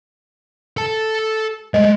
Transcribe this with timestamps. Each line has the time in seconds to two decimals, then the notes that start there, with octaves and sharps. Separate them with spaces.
0.77 A4 A5
1.74 G#3 A3 D#5